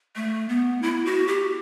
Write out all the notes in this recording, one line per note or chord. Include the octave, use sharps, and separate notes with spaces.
A3
B3
E4
F#4
G4